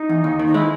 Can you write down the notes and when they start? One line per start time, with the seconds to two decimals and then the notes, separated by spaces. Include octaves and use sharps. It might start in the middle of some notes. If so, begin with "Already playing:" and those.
Already playing: D#4
0.09 E2
0.24 D#2
0.39 D#3
0.47 D#4
0.54 G#3 E4